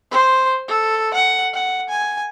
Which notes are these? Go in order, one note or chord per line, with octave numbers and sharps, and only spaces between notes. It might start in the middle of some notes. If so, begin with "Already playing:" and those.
C5
A4
F#5
F#5
G#5